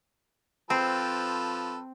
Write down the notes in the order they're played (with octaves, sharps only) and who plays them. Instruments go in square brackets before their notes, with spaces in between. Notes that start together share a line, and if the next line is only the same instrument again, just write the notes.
[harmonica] F3 A4 B4 [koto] C4